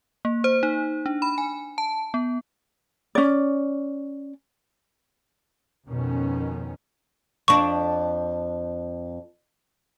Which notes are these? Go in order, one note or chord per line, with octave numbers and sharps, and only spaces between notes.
A#3
C5
D#4
D4
B5
G#5
A5
B3
C#4 D5
F2 B2 D#3 C#4
F2 D4 C#6